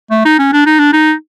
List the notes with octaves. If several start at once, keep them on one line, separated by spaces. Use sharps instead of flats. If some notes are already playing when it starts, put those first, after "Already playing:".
A3
D#4
C#4
D4
D#4
D4
D#4